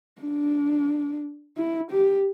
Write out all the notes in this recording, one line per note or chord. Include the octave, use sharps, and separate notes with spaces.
D4
E4
G4